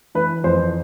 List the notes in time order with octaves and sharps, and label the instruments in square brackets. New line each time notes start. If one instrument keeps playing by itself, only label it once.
[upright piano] E3 B4
F2 C5